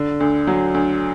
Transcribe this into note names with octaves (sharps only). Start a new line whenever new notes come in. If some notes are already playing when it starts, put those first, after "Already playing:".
Already playing: D3
D2
F#3
D2